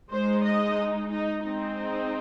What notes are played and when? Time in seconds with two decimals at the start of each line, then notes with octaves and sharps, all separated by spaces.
0.11 G#3 D#4 C5
0.45 D#5
1.12 D#4
1.45 G#3 C4 D#4